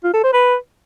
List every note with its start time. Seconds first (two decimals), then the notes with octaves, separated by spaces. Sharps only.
0.04 F4
0.14 A4
0.23 C5
0.33 B4